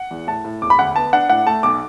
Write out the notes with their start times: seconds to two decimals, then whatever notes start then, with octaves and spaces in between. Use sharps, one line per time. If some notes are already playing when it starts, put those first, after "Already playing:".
Already playing: F#5
0.11 E2
0.27 A2 A5
0.45 A2
0.62 E1 D6
0.70 B5
0.79 D2 F#5
0.96 B3 A5
1.13 D4 F#5
1.29 A2 F#5
1.47 A3 A5
1.63 B1 D6